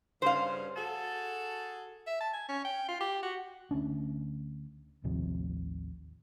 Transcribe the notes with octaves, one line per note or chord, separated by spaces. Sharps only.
G2 C#3 C5 F5
F#4 G#4 A4
E5
A5
G#5
C#4
G5
F4
G4
F#4
D2 C#4 D4
A1 D#2 C3 F3